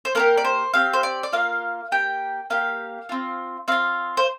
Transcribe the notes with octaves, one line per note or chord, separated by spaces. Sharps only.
C5
A#3 D4 G4 A#4
D5
C5
C4 G4 F5
C5
D5
D5
A#3 F4 F5
A#3 G4 G5
A#3 G4 F5
C4 F4
C4 F4 F5
C5